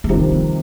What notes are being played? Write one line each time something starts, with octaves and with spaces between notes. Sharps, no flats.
D#4
F2 C3 D#3 G3 D4
C4